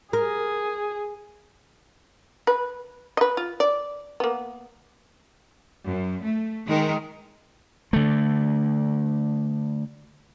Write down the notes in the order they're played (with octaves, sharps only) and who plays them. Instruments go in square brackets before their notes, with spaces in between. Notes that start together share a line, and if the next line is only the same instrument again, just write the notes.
[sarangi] G#4 [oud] A#4
[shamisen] B4
B4 D#5
F4
D5
A#3 B3
[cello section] F#2
A3
D#3 G#3 A#4
[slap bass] D3 A3